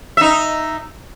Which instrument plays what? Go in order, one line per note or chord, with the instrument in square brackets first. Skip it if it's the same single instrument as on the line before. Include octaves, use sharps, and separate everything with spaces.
[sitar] D#4 E5